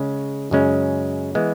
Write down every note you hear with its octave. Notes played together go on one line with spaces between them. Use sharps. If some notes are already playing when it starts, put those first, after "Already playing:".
Already playing: C#3 G#3 C#4
F#2 C#3 G#3 C#4
E3 G#3 B3